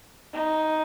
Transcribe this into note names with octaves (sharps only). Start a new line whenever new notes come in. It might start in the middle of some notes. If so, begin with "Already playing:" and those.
D#4